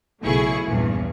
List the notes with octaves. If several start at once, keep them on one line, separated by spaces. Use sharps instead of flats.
B1 C#3 A3 E4 G#4 C#6
A#1 E2 G2